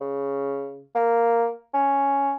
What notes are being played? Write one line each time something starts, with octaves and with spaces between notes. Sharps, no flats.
C#3
A#3
C#4